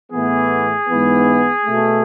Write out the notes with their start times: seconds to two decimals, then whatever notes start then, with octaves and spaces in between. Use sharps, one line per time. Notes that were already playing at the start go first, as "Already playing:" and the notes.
0.11 A2 E3 B3 G#4
0.88 G#2 E3 B3
1.64 B2 A3